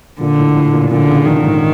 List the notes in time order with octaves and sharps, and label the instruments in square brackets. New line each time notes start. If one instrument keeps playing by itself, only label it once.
[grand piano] A#2 [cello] D3
[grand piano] A2
A2
A#2
[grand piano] A#2 [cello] D3
[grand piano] C#3
[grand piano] D3 [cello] D#3
[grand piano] G#2